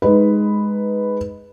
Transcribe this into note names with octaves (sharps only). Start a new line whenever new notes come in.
G#3 D#4 B4